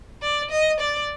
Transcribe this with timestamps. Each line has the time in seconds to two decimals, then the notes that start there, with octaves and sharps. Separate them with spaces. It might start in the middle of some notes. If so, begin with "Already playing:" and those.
0.22 D5
0.51 D#5
0.80 D5